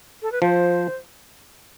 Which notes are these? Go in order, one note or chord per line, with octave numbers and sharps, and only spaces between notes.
A4
B4
F3 C5